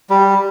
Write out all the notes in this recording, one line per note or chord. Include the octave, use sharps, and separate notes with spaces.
G3